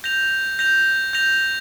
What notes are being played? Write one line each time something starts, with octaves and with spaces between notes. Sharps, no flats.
G6 A#6 F7
G6 A#6 F7
G6 A#6 F7